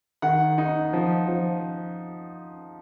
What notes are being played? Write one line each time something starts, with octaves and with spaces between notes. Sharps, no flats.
D#3 F#5
D#4
F3
F3